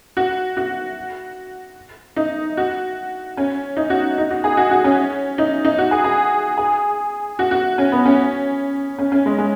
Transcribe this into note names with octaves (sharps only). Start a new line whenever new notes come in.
F#4
F#4
D#4
F#4
C#4
D#4
F#4
D#4
F#4
G#4
F#4
F#4
C#4
D#4
D#4
F#4
G#4
G#4
G#4
F#4
F#4
C#4
B3
C#4
C#4
C#4
G#3
G#3